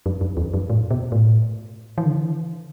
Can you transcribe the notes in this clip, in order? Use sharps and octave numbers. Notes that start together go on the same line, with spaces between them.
F#2
F#2
E2
F#2
A2
B2
A2
E3
D3
E3